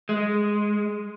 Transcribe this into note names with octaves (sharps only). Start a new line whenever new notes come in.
G#3